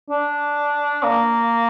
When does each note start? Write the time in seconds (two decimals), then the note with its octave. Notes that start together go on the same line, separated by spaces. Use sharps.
0.10 D4
1.03 A#3